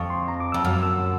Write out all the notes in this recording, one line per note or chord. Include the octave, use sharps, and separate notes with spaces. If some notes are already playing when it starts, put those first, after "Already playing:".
Already playing: F2 C#6
C6
A#5
D6
F2 E6
F#2 F6
E6